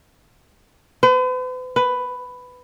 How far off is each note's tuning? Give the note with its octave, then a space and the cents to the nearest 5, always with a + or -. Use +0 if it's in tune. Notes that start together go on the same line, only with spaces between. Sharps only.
B4 +45
B4 +10